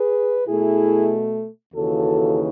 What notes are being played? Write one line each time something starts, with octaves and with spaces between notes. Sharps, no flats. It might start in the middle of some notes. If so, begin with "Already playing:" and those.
Already playing: G#4 B4
B2 A3 E4 G#4
D#2 C#3 E3 F#4 A4